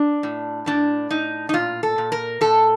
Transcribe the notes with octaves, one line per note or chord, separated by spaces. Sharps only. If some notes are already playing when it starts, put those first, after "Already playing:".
Already playing: D4
A2
A2 D4
A2 D#4
D#4
A#2 F4
A4
A#2
A#4
A#2 A4